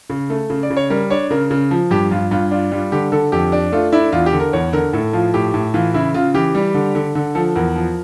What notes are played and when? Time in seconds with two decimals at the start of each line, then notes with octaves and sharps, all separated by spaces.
0.10 C#3
0.30 A3
0.50 C#3
0.63 D5
0.70 C#3
0.77 C#5
0.90 G3 A#4
1.10 D4 C#5
1.30 C#3 A#4
1.51 C#3
1.71 F3
1.91 G2 G4
2.11 G2 F4
2.31 G2 F4
2.51 D4 F4
2.71 G3 F4
2.92 D3 G4
3.12 D3 A4
3.32 F2 G4
3.52 D4
3.72 A3 F4
3.92 D4 E4
4.12 E2 F4
4.26 G4
4.33 D3
4.40 A#4
4.53 E2 C#5
4.73 D3 A#4
4.93 A2 A4
5.13 F3 F4
5.34 A2 G4
5.54 A2
5.74 E3 F4
5.94 C#3 E4
6.14 C#3 F4
6.34 E3 G4
6.55 G3
6.74 D3
6.95 D3
7.15 D3
7.35 F3 A4
7.56 E2 A#4
7.76 F3